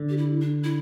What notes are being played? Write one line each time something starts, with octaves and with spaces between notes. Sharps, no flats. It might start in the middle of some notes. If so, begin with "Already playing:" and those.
Already playing: D3
G4
E4
D4
E4